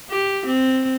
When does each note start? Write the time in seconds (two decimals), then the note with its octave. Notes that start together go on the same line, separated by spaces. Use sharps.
0.10 G4
0.46 C4